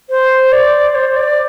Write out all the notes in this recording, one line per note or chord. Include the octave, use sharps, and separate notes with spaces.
C5
D5
C5
D5